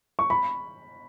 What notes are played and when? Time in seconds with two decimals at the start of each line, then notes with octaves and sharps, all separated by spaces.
0.19 C#6
0.30 B5